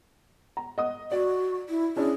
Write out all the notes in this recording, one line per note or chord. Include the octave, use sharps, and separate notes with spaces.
A#5
D#5 F#5 D#6
F#4 D5
E4
C#4 D4 E4 G#4